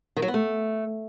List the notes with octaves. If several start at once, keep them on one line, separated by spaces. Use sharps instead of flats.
D#3
F#3
B3
A3